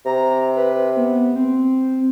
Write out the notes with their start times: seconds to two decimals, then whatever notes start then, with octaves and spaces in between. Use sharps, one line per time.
0.05 C3 A#5
0.56 B4
0.97 B3
1.36 C4